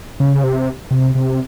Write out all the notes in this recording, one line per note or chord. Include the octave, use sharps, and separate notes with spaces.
C#3
C3
C3
C3